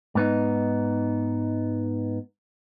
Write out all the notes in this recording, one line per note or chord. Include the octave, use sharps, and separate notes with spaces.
G#2 B3 D#4